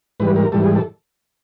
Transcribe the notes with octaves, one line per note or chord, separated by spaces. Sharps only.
G#2 E3 G3 B4
A#4
G#2 E3 G3 A4
G#4
A4